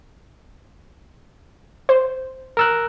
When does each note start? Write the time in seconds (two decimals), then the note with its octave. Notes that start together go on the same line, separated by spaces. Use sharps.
1.89 C5
2.57 A#4 E6 F#6